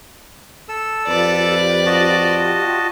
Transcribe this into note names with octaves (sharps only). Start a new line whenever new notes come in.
A4 E6
F2 F4 G4 B4 D5
F#4 D#5 A5